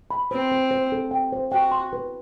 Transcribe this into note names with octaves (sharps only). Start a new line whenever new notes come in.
B5
C4 C5
C5
C5
A4
G5
C5
F#4 G5
C6
B4